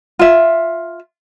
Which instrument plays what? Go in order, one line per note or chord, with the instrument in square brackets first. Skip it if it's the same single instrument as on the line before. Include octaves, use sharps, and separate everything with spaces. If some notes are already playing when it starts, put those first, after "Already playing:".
[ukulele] F4 E5